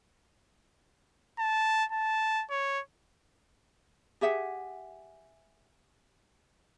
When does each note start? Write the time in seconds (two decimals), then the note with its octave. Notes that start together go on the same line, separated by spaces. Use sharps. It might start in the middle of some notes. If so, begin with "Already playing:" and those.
1.39 A5
1.92 A5
2.50 C#5
4.21 G4 G#4 E5 F#5